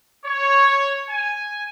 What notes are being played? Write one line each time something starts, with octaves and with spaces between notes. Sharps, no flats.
C#5
G#5